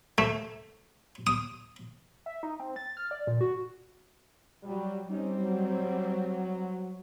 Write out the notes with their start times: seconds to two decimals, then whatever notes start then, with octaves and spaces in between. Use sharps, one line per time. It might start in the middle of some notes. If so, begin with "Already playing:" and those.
0.18 A3
1.27 D#6
2.26 E5
2.43 D#4
2.59 C4
2.76 A6
2.97 F6
3.11 D5
3.27 A#2
3.41 F#4
4.63 F#3 G3
5.08 G3 C4 C#4 D#4
5.38 F#3